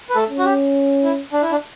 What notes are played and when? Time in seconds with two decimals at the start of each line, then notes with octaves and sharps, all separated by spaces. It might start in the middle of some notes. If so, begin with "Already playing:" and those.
0.10 B4
0.15 A3 A4
0.30 C#4
0.39 F#4
0.45 G4
1.03 E4
1.33 D4
1.42 E4
1.51 D4